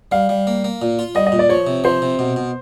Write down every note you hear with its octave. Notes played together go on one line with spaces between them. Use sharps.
G3 F5
G3
A#3
A#3
A#2
F4
G3 D#5
D#5
A#2
D5
F3 C#5
C3
F3 C5
C3
B2
B2